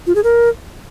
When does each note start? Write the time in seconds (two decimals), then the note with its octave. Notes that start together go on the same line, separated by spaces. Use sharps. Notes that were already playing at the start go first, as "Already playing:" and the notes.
0.07 F4
0.15 G#4
0.24 A#4